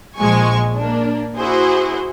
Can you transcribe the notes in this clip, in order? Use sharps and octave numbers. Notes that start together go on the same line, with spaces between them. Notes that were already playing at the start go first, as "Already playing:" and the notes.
A#1 F3 G#3 G#5 C#6
A#3 D4
E4 F#4 G#4 C5